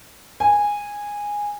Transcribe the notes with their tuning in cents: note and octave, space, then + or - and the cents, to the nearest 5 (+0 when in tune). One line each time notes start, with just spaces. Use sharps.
G#5 -10